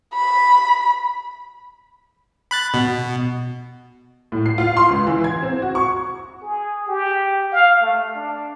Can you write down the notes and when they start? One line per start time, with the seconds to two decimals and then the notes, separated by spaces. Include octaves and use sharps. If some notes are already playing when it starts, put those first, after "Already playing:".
0.14 B5
2.51 B5 F#6 A6
2.74 B2
4.32 A2
4.46 C7
4.58 F4
4.77 C6
4.89 C#2
5.07 E3
5.24 G#6
5.42 C4
5.62 F#4
5.75 C#6
6.42 G#4
6.88 G4
7.53 F5
7.82 A3
8.15 D4